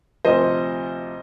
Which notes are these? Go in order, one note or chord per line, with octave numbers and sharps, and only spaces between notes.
D2 C3 F3 C5 D#5